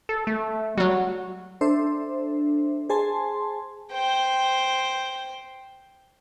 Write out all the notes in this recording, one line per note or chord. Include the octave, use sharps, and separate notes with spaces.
A4
A3
F#3 G3 F#4
D4 A4 C5 E5
G#4 C5 G#5 A5 C6
C5 G5